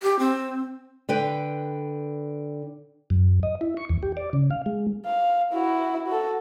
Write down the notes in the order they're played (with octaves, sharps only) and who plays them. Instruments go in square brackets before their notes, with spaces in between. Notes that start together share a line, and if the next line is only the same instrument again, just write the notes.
[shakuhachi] G4
C4
[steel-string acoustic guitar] D3 B4 G5
[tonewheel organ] F#2
D#5
E4
C#6
E2
G4
D5
C#3
F5
G#3
[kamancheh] F5
E4 F#4
F#4 A4